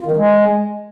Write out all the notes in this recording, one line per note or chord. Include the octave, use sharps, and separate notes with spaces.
F4
D#3
E3
G#3